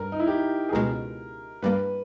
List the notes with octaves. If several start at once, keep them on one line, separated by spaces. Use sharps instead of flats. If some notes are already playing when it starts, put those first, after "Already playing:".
Already playing: G2 A#4
D#4
E4
G4
G#4
C#2 B2 G#3 A#4
G2 G3 A#3 B4